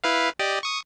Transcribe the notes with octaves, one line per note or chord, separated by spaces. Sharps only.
E4 B4 F5
G4 D5 D#5
C#6 D#6